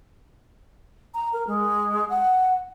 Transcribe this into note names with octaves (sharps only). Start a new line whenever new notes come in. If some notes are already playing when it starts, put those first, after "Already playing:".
A#5
A#4
G#3
F#5